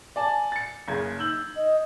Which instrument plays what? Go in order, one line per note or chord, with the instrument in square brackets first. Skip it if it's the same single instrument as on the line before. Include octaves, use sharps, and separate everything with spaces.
[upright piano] D5 G#5 A5
A6 C#7
F#1 C#3 G#6
[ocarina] D#4 [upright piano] E6 G6 F#7
[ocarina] D#5